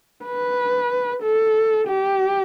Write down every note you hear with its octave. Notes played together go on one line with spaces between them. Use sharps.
B4
A4
G4